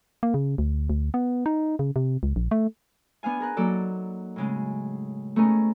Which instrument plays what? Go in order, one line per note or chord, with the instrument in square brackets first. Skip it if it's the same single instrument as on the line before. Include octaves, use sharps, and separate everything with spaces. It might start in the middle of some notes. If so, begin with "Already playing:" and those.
[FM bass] A#3
C#3
D2
D2
B3
D#4
C#3
C3
C#2
A#1
A3
[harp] B3 D4 F5 G#5
G#4 A#4 F#6
F#3 A#3 D#4 A4 D5
A2 C#3 G#3
A3 B3 C#4 D#4 G#4 A#4